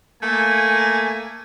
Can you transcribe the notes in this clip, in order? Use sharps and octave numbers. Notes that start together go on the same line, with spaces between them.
A3 A#3 G#5